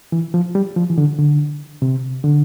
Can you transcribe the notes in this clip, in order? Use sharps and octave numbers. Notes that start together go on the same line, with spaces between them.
E3
F3
G3
F3
E3
D3
D3
C3
D3